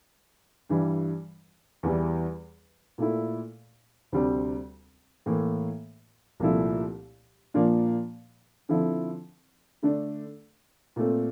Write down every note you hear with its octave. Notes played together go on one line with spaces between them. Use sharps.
G2 E3 G3
E2 E3 G3
A#2 A3 E4
D2 C3 G3 C4
A2 E3 A#3
C2 A#2 F3 A3 E4
A#2 F3 A#3 D4 F4
D3 F3 C4 E4
D3 A3 D4
A#2 A3 C4